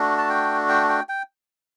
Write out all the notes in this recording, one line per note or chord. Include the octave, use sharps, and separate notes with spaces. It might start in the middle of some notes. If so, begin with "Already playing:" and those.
Already playing: A3 D4 F#4
A5
G5
G5
G5
G5